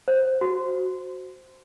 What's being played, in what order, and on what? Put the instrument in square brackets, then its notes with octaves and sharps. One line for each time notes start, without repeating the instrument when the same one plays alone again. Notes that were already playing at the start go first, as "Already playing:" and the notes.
[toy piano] C5
F#4